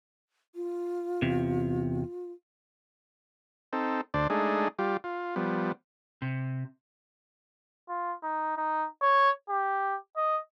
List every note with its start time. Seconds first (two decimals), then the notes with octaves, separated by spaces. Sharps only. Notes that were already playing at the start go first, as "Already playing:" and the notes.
0.55 F4
1.22 E2 C3
3.73 C4 D#4 A4
4.14 D2 D4 C5 D5
4.30 G#3 A3 D4 D#4 G#4
4.79 G3 F4 G4
5.04 F4
5.36 F3 G3 B3
6.22 C3
7.89 F4
8.23 D#4
8.57 D#4
9.02 C#5
9.49 G4
10.17 D#5